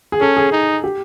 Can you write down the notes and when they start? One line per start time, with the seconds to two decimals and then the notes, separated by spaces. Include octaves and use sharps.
0.12 G#4
0.21 C#4 A4
0.37 G#4
0.52 D#4
0.84 G4